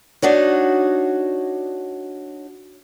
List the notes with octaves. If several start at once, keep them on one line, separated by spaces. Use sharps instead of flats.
D4 D#4 F#4 C#5